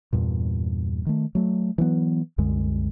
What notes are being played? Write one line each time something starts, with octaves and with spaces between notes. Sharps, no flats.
E2 G2 A#2
D#3 A3
F#3 A3
E3 F#3 B3
C2 F#2 D3 G#3